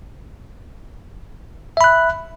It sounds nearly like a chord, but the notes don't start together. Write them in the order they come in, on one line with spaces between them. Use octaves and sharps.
E5 B5 F#6